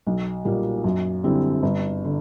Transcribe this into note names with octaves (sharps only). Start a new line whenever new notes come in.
B1
A#2 G3 A#3
F#2
D3 G3 C4 E4
G1
D3